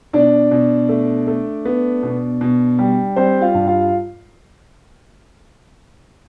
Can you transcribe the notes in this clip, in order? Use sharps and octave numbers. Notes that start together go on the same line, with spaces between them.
B2 D4 D5
B2
A3
A3
B3
B2
B2
G3
G3 C4 C5
F4 F5
G2
F4 F5